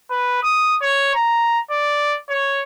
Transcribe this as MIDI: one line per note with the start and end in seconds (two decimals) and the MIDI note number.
0.10 0.39 71
0.43 0.76 87
0.82 1.13 73
1.15 1.59 82
1.70 2.17 74
2.29 2.63 73